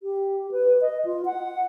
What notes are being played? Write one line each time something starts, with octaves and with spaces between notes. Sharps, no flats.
G4
B4
D#5
F4
F#5